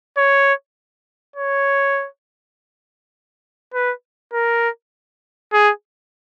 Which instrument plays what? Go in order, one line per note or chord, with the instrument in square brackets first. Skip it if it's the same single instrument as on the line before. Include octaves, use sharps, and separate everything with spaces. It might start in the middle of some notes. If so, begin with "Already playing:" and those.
[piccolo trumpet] C#5
C#5
B4
A#4
G#4